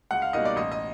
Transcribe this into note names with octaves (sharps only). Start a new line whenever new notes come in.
C#2 F#5
F5
B2 G3 A#3 D#4 D#5
D5
A1 D#5
D#5